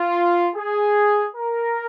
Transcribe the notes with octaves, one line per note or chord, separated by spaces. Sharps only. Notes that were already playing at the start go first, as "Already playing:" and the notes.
Already playing: F4
G#4
A#4